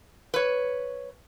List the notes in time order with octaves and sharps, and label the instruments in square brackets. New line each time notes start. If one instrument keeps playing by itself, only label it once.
[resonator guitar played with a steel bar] B4 C#5